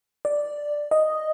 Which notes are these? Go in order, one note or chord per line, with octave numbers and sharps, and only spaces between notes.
D5
D#5